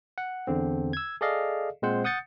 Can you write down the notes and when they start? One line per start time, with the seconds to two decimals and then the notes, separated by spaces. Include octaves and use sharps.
0.18 F#5
0.47 E2 D3 C4
0.93 E6 G#6
1.21 G#4 A4 D5 D#5 F5
1.82 A#2 G#3 C4 C5 F#5
2.04 F#5 D#6 G6 A6 C#7